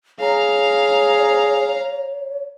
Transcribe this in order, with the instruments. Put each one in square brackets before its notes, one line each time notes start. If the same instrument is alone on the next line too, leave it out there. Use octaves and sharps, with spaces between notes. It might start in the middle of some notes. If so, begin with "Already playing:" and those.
[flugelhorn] G#4 [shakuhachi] C#5 [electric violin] F5 A#5